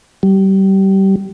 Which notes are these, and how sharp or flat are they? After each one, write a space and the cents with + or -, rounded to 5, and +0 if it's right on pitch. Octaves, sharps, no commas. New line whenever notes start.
G3 -25